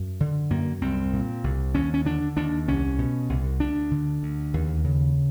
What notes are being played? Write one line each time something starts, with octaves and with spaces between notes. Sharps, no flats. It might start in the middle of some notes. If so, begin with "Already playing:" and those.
Already playing: F#2
D3
F#2 A#3
C2 C4
A#2
C2
D#2 C#4
C#4
D3 D4
D#2 D4
C2 C#4
B2
C2
D2 D4
D3
D2
D#2
C#3